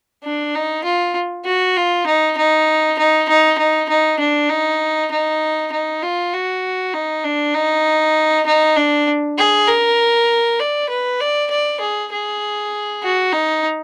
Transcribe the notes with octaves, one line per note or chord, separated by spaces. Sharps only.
D4
D#4
F4
F#4
F4
D#4
D#4
D#4
D#4
D#4
D#4
D4
D#4
D#4
D#4
F4
F#4
D#4
D4
D#4
D#4
D4
G#4
A#4
D5
B4
D5
D5
G#4
G#4
F#4
D#4